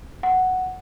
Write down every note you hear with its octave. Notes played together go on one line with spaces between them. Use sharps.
F#5